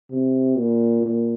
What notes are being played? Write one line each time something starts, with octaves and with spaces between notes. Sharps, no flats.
C3
A#2
A#2